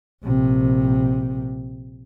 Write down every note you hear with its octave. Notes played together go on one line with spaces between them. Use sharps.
A#1 C3